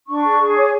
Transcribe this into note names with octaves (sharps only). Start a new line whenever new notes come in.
D4 C#6
G#4
G#4
C#5 D6